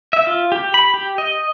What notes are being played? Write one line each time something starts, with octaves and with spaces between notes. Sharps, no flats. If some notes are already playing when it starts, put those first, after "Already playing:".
E5
F4
G4
B5
G4
D#5